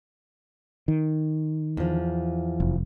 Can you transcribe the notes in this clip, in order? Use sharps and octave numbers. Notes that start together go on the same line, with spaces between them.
D#3
E2 F3
F1